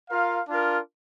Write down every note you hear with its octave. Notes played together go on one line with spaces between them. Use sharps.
F4 A#4 F5
D4 F4 A#4